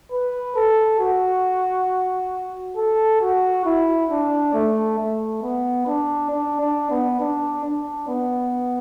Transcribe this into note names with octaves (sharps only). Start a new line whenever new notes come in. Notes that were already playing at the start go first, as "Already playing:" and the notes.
B4
A4
F#4
A4
F#4
E4
D4
A3
A3
B3
D4
D4
D4
B3
D4
D4
B3